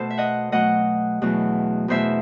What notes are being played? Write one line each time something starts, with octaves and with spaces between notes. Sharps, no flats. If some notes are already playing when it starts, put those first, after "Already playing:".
Already playing: B2 A3 A4 C5
E5
D#5 F#5
B2 F#3 A3 D#5 F#5
E2 B2 F#3 A3
E2 B2 A3 C5 E5